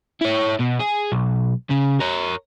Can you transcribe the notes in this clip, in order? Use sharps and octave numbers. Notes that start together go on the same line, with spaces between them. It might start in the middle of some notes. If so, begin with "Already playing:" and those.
E4 C#5
B2
G#4
B1
C#3
A#4 C#5